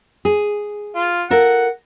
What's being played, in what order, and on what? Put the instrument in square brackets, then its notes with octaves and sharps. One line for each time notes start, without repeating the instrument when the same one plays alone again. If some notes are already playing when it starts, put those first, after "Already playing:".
[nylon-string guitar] G#4
[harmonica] F4
[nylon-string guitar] F4 A4 A#4 [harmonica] F#5